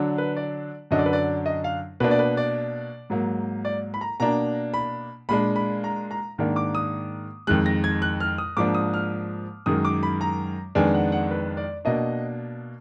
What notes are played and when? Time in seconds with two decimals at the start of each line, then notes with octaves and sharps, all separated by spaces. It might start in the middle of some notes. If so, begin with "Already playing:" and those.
Already playing: D3 F#3 D4
0.18 B4
0.37 D5
0.91 F#2 D3 F#3 D4 D#5
0.99 D5
1.06 B4
1.13 D5
1.46 D#5
1.64 F5
2.00 B2 A#3 D4 B4
2.11 D5
2.19 B4
2.37 D5
3.10 G#2 F#3 A#3
3.65 D5
3.94 B5
4.01 A#5
4.20 B2 A#3 D4 A#5
4.74 B5
5.29 A#2 G#3 D4 B5
5.56 B5
5.84 A#5
6.11 A#5
6.38 G#2 D#3 A#3 D4
6.56 D6
6.75 D#6
7.47 F2 D#3 G#3 F#6
7.66 A#6
7.84 G#6
8.02 F#6
8.20 F6
8.38 D#6
8.57 G#2 F3 A#3 D4 D6
8.75 D#6
8.94 F6
9.66 F#2 D#3 G#3 D#6
9.85 D6
10.03 B5
10.21 A#5
10.75 F2 D#3 G#3 B3 D4 G#5
10.94 F#5
11.12 F#5
11.31 B4
11.57 D5
11.85 B2 A#3 D4 D#5